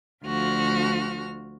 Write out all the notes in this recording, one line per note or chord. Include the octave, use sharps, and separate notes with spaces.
D2 F3 F4 F#4 F6